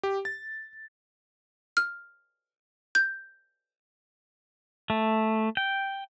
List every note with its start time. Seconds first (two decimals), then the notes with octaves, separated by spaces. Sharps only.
0.03 G4
0.25 A6
1.77 F6
2.95 G6
4.90 A3
5.57 G5